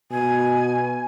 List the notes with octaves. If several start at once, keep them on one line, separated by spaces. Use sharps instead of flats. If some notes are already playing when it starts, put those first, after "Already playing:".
B2 G#5